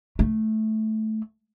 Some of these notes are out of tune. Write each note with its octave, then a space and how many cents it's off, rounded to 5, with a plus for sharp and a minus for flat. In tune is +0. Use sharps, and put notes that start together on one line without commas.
A3 -10